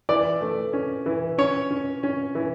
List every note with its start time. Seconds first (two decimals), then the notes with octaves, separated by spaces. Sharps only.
0.09 E3 D5
0.41 A3
0.73 C#4
1.06 E3
1.38 C#4 C#5
1.70 C#4
2.03 C#4
2.35 E3